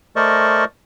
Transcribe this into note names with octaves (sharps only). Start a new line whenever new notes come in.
A3 A#4 C5 D5 D#5 C#6